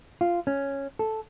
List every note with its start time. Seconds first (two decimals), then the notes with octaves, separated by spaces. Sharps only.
0.21 F4
0.47 C#4
0.99 A4